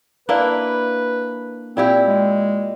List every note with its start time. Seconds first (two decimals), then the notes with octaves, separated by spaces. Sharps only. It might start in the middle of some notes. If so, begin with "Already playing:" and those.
0.29 A#3 D4 E4 B4
1.77 A#2 C4 E4 G4
2.06 G#3